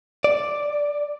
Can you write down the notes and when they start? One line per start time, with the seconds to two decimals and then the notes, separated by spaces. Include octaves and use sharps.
0.24 D5